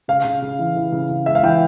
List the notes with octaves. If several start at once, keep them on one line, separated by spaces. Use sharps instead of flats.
C#3 F5
C#3
C#3
E3
E3
C#3
C#3
G#3 E5
F5
E3 G5